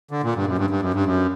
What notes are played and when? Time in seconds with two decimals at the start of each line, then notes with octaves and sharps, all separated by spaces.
0.11 D3
0.23 A#2
0.35 G2
0.46 F#2
0.58 G2
0.70 G2
0.82 F#2
0.94 G2
1.06 F#2